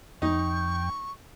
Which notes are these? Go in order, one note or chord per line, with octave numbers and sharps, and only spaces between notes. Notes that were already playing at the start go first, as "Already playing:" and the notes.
F2 D#4 G5 C#6